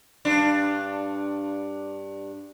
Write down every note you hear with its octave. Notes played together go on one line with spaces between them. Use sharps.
G2 D4